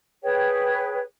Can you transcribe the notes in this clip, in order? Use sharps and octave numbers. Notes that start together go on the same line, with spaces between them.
G#4 B4 C#5 G5